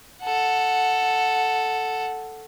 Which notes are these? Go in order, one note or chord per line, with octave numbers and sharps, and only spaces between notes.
A4 F#5